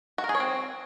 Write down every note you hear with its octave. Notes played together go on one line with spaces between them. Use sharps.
F#4
A#4
G#4
C#5
C4